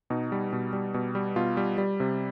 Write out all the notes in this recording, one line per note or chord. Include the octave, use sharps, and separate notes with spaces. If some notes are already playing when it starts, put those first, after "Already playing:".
B2 D#4
G3
B2
G3
B2
G3
B2 F4
G3
G3
C3